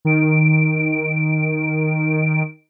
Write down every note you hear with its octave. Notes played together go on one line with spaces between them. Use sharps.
D#3 D7